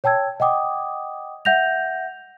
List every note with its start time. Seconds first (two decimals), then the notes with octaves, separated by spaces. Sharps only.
0.04 C#5 G5 A5 E6 G#6
0.40 D#5 F#5 G5 D6 D#6
1.45 E5 F#5 G6 A#6 F7